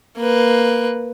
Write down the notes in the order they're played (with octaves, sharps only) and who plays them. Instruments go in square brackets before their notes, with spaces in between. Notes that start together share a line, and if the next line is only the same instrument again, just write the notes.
[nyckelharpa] A#3 B4